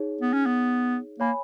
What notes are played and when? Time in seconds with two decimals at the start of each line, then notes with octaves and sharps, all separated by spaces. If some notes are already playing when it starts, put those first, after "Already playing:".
Already playing: D#4 G#4 C#5
0.21 B3
0.33 C#4
0.46 B3
1.20 A#3 C#5 G#5 B5